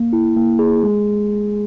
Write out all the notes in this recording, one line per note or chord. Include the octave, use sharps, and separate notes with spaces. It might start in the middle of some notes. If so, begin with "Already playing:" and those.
Already playing: A#3
E4
A#3
G#4
G#3